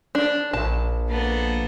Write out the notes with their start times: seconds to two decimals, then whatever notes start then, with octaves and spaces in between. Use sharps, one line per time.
0.15 D4
0.53 A#1 A5
1.09 A#3 B3 A4